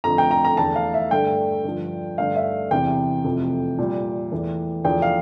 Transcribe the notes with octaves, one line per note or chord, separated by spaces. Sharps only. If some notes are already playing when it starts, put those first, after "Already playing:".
F2 D3 A3 A#5
G5
A#5
A#5
E2 D3 A3 A5
F5
E5
G2 D3 A3 G5
G2 D3 F3
G2 D3 A3 F5
E5
E2 C3 E3 G5
F2 C3 E3 A3
A#2 G3
E2 E3 A3
E2 D3 F3 A3 G5
F5